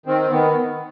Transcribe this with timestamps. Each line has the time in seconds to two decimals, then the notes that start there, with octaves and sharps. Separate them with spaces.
0.06 D#3 C4
0.30 D#3 B3